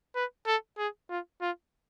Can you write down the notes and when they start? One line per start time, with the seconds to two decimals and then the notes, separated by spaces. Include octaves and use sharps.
0.15 B4
0.47 A4
0.78 G#4
1.10 F4
1.41 F4